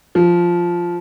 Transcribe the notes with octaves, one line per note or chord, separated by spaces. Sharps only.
F3